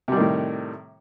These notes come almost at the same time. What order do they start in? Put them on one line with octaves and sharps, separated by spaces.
C3 G3 D#3 A2